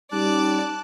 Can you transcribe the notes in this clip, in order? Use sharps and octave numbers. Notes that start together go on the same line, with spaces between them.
G3 C#4 D#4 D5 A5 D6 F#6